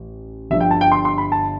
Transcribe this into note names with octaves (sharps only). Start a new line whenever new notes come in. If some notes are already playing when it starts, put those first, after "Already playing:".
Already playing: A1
G1 G2 D3 F3 E5
G5
A5
G5
C6
C6
B5
A5